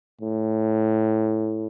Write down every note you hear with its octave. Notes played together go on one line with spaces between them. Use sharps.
A2